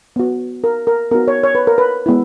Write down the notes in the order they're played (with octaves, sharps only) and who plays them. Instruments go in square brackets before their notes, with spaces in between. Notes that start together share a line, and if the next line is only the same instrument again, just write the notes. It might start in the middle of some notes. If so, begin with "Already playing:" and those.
[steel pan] B3 F#4
A#4
A#4
B3 D#4 F#4 A#4
C#5
C#5
B4
A#4
B4
G#3 B3 E4